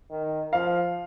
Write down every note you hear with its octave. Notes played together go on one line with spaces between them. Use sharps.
D#3
F3 F5